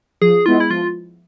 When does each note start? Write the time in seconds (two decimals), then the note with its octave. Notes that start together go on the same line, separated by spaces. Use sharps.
0.21 F3 G#4
0.45 G#3 B3 E4 F4
0.60 E4
0.70 F3 F4